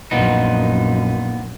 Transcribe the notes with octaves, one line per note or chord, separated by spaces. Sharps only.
A#1 F#2 A#2 B3 D#4